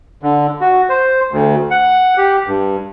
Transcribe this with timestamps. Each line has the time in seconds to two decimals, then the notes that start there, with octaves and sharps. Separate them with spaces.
0.22 D3
0.61 F#4
0.89 C5
1.31 D2
1.71 F#5
2.17 G4
2.47 G2